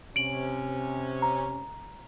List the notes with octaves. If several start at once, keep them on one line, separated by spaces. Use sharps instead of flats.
C3 C#4 D7 F#7
A#5